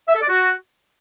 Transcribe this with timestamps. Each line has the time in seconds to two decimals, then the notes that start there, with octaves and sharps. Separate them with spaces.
0.08 E5
0.15 A4
0.21 D5
0.28 F#4